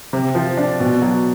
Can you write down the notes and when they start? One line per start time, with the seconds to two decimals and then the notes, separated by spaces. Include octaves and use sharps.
0.13 C3
0.35 F3
0.57 D4
0.80 B2
1.02 F#3